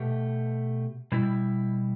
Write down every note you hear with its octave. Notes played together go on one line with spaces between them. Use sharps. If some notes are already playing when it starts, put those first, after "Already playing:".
Already playing: B2 A3 G4
B2 G3 E4